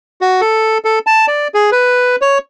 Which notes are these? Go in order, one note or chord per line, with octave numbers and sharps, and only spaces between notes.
F#4
A4
A4
A5
D5
G#4
B4
C#5